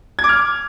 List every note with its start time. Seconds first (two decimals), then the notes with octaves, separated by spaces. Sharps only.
0.19 G#6
0.24 D6
0.29 F6